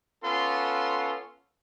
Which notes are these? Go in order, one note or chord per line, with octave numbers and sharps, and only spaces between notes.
B3 C#4 F4 A4 C6